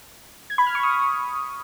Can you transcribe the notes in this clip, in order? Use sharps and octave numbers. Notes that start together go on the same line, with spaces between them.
G#6
B5
F6
C#6
D#6